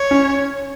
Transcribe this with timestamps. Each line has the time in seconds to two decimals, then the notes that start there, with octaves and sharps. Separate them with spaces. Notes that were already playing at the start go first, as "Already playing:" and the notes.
Already playing: C#5
0.11 C#4